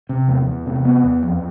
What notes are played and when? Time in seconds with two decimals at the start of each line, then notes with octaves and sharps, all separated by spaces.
0.09 C3
0.28 E2
0.47 E2
0.66 C3
0.85 B3
1.04 E2
1.23 F2